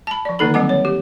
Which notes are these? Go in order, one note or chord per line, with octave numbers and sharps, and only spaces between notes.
A5 B5
F3 D5
D3 D#3 A#3 D#4 A4 B5
D3 F#3 G3 C4 F#5 D6
C#5
G4